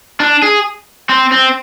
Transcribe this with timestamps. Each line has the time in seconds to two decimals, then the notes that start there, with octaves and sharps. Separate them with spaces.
0.20 D4
0.42 G#4
1.09 C4
1.32 C4